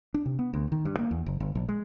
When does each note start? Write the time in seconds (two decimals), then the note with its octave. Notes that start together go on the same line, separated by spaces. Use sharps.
0.14 D4
0.26 C3
0.39 B3
0.54 D2
0.72 D#3
0.85 G2
0.99 A#3
1.11 E2
1.26 F#1
1.40 G1
1.55 A#1
1.69 G#3